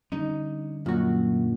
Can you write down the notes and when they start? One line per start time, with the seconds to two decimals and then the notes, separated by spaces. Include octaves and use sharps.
0.12 D3 G3 C#4 D#4
0.86 F#2 A#2 F#4